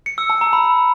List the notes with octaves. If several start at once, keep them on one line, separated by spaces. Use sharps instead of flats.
C#7
E6
A5
A#5
B5